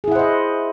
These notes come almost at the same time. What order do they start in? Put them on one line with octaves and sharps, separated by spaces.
G#4 E4 F#5 C5 D#5